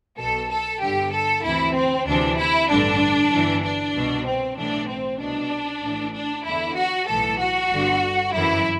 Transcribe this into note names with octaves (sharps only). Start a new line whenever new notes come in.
B1 B2 A4
A4
G1 G2 D3 G4
A4
D2 C3 E3 E4
C4
D2 C3 E3 D4
E4
A1 G2 D3 D4
G1 G2 E3
D4
C2 B2
C4
B1 A2 E3 D4
C4
C2 B2 D4
A1 A2 E3
D4
E2 D3 E4
F#4
B1 A2 E3 A4
F#4
G1 G2 D3
G1 F#2 E3 E4